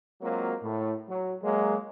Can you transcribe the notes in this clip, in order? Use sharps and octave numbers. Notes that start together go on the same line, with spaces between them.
F#3 G#3 A#3 C4 F4 F#4
A2
F#3
F#3 G#3 A#3